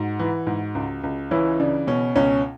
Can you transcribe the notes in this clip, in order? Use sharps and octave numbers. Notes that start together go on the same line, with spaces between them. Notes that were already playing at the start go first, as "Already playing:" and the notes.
Already playing: G#2 F#4
E3
G#2
C#2
C#2
E3 C#4 E4
C#3 D4
B2 C#4
C#2 C#4